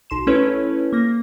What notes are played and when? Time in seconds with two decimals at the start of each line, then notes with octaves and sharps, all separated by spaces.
0.10 B1 C6 E7
0.27 A3 C#4 E4 A4 B4 C#5
0.93 A#3 A#6